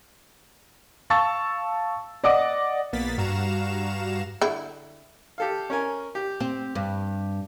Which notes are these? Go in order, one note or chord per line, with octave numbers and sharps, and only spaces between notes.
F5 A5 C#6 E6 A6
D5 D#5 F#5 D6
A#1 A#3 B3 A6 B6
G2 F#4 F5 A#5 E7
D3 E4
G4 A4 F5
C#4 A#4 G#5
G4
C4
G2